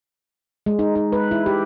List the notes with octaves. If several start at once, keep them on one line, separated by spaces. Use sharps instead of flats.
G#3
D#4
D#4
B4
E4
G4